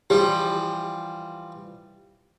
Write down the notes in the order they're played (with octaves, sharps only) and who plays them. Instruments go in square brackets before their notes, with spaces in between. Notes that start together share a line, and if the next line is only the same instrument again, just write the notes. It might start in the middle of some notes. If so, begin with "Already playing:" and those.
[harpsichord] E3 F3 G3 [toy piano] G4